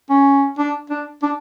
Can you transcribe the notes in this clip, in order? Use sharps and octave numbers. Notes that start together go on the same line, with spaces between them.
C#4
D4
D4
D4